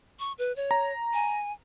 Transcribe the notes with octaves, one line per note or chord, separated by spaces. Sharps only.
C#6
B4
C#5
A#5
G#5